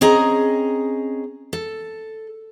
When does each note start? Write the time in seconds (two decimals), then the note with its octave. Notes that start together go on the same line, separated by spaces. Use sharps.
0.01 C4 C#4 G#4 D#5 A#5
1.53 A4